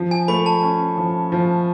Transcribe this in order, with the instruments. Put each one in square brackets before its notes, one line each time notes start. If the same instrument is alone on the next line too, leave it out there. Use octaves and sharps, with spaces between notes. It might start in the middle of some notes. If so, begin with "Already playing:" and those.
Already playing: [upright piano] F3
[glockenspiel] G#5
[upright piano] A3 [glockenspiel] B5
[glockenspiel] A5
[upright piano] C#4
F3
F3